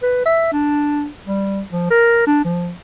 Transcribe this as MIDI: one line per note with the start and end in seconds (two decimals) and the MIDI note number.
0.03 0.22 71
0.26 0.48 76
0.52 1.07 62
1.27 1.62 55
1.71 1.86 53
1.91 2.27 70
2.27 2.42 62
2.45 2.72 53